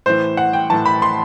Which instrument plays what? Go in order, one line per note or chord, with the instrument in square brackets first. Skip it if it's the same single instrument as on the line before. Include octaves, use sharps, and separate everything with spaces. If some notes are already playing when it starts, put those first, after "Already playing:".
[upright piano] A2 E3 C5
F#5
G5
A2 E3 A5
B5
C6